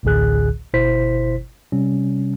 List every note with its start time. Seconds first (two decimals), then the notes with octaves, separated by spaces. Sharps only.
0.03 A1 D2 A2 D3 G#4 F#6
0.74 G1 B2 E4 C5 B6
1.72 C3 G3 C#4